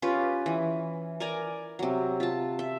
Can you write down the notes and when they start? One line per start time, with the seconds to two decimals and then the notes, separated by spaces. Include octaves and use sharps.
0.02 C#4 F4 G4 B4
0.46 E3
1.20 A#4 D5 G#5 A#5
1.79 C3 F#3
2.20 F4 A5
2.59 E5